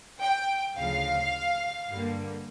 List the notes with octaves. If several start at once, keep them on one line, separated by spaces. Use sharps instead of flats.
G5
D2 C#3 F3 F5
G2 D3 G3 A#3